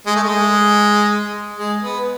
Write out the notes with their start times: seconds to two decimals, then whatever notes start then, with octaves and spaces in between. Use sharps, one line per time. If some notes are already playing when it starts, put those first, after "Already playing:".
0.06 G#3
0.16 A3
0.24 G#3
1.57 G#3
1.82 B3